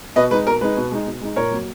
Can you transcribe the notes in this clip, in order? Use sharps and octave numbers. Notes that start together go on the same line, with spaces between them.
B2 B4 D#5
G#3 D#4 B4
B2 A#4
G#3 D#4 B4
B2
G#3 D#4
B2
G#3 D#4
A#2 A#4 C#5
F#3 A#3